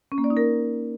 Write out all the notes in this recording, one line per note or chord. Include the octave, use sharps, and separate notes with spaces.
C#4
A#3
D5
D#4
A#4